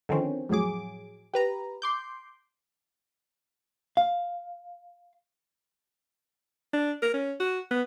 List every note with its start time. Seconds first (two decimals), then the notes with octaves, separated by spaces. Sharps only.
0.09 D3 D#3 F3 C4 C#4
0.49 F2 A2 F#3 G#4 D6
1.34 G4 B4 A#5
1.82 C6 D6 G6
3.97 F5
6.73 D4
7.02 A#4
7.14 C#4
7.40 F#4
7.71 B3